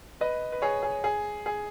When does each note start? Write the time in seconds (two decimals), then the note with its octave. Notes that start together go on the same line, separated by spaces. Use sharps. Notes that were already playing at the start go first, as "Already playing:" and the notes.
0.21 B4 D#5
0.52 B4
0.62 G#4 C#5
0.83 G#4
1.04 G#4
1.46 G#4